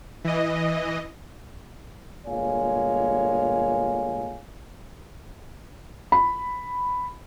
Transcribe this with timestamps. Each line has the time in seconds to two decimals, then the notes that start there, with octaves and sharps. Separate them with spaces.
0.24 E3 D#5
2.27 G1 A#2 G#3 C#5 F5 G#5
6.12 B5